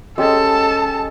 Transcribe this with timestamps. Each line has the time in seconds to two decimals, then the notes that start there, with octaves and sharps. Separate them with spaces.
0.18 G#3 C#4 G4 A4 A5